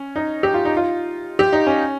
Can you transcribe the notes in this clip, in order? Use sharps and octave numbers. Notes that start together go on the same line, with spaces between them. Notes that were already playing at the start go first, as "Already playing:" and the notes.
Already playing: C#4
D#4
G4
F4
D#4
F4
G4
D#4
C#4